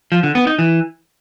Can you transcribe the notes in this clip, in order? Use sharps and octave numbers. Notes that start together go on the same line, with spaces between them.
F3
D3
B3
D#4
E3